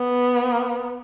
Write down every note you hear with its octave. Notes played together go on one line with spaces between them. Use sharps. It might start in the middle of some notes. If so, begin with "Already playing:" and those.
Already playing: B3